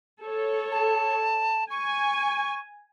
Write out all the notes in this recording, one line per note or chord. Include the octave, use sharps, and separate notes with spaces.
A4 C#5
A5
G#5 C#6